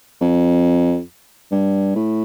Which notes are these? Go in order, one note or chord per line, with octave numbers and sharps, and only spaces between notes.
F2
G2
A2